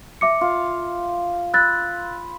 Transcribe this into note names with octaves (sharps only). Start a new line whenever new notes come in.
E5 D6 C#7
F4
B5 E6 F#6 A6